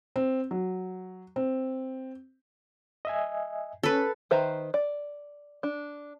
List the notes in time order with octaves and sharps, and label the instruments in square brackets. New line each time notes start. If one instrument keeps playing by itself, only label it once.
[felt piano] C4
F#3
C4
[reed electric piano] D#5 E5 G#5
[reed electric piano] C#4 [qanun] A4 B4
[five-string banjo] D#3 B4 C5 E5 A#5
D5
D4